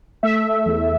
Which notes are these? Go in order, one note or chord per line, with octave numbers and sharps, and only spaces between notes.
A3 E5
A3
E2